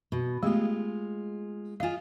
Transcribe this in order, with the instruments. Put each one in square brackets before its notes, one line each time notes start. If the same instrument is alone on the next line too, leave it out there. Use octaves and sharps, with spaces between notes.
[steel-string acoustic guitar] B2
[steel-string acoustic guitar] G#3 F4 [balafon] A3 B3 G4
[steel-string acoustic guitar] F4 D#5 [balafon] F5 G#5